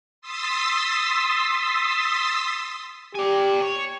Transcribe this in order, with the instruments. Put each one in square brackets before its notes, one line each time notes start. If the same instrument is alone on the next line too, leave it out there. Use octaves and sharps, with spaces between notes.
[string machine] C6 D#6 E6 A6 B6
[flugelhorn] G4 [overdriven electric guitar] D5 G#5
[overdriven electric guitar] C#5